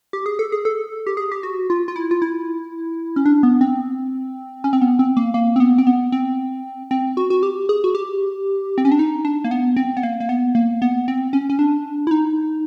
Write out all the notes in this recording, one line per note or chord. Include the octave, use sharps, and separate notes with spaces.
G4
G#4
A4
G#4
A4
G4
G#4
G4
F#4
F4
F4
E4
F4
E4
C#4
D4
B3
C4
C#4
C4
B3
C4
A#3
A#3
C4
B3
C4
B3
C4
C4
F#4
F#4
G4
G#4
F#4
G4
C4
C#4
D4
D#4
D4
A#3
B3
C4
B3
A#3
A#3
B3
A#3
B3
C4
C#4
C#4
D4
E4
D#4